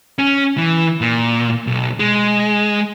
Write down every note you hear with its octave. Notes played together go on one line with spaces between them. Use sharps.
C#4
E3
A#2
B1
G#3